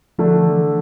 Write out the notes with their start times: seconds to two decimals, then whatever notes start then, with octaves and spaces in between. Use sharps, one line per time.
0.18 D3 F3 A3 D4
0.43 E3